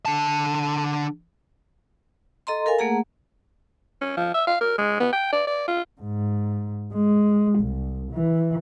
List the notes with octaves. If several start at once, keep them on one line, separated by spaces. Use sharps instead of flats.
D3 A5
A4 D#5 A#5 C6
A4 A#4 F5 G#5
A3 A#3 G#4 F#5 A#5
C#4
F3
E5
F5
A#4
G#3
B3
G5
D5
D5
F4
G#2
G#3
C2
E3